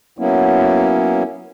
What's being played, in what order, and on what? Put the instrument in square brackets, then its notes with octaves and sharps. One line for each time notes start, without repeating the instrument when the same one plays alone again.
[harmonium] F#3 A#3 B3 C#4 E4